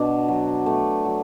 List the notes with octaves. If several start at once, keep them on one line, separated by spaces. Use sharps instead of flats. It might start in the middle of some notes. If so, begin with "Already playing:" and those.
Already playing: B2 D4
F#3
A3
F#3